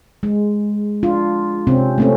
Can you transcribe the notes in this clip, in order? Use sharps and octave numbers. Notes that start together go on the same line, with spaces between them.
G#3
D4 F4
C3 C4 C#4
A3 C4 C#4